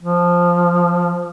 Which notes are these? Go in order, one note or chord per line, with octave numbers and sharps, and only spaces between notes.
F3